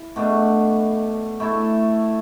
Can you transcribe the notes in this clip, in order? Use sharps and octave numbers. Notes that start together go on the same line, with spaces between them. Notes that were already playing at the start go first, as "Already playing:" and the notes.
Already playing: E4
B2 A3 D4
A3 E4 A4